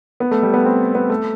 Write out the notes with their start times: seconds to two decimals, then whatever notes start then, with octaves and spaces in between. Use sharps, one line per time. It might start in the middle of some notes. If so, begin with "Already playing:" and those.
0.20 B3
0.31 A3
0.43 G3
0.54 B3
0.65 C4
0.95 B3
1.10 A3